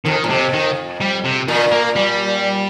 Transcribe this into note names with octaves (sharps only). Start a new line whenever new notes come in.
F2 D#3
F2 A#2
C3
D#3
G3
C3
A#2 D#3
A#3
G3